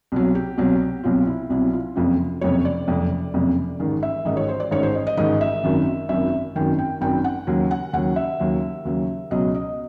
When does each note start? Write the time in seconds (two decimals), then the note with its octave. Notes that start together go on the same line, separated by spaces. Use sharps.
0.12 C2 B2 F#3
0.35 G4
0.58 C2 B2 F#3
1.04 C2 B2 F#3 F4
1.27 E4
1.50 C2 B2 F#3 E4
1.73 F4
1.96 F#1 F2 C3 F4
2.41 F#1 F2 C3 C#5
2.65 D5
2.88 F#1 F2 C3
3.34 F#1 F2 C3
3.80 A1 G#2 D#3
4.03 E5
4.25 A1 G#2 D#3 D#5
4.37 C#5
4.48 C5
4.60 D5
4.71 A1 G#2 D#3 C#5
4.83 C5
4.95 D#5
5.07 D#5
5.17 A1 G#2 D#3 D#5
5.41 E5
5.64 G#1 F#2 D#3
6.09 G#1 F#2 D#3 E5
6.56 G#1 F#2 D#3 G5
6.79 G5
7.01 G#1 F#2 D#3 G5
7.24 F#5
7.47 D#2 C#3 F#3
7.71 F#5
7.93 D#2 C#3 F#3 F#5
8.16 E5
8.40 D#2 C#3 F#3
8.85 D#2 C#3 F#3
9.31 C#2 B2 F#3 D#5
9.55 D#5